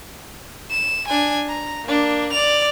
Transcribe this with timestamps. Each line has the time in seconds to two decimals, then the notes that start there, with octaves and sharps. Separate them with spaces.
0.70 E7
1.08 D4 G#5
1.48 A#5
1.85 A#3 D4
2.32 D5 F7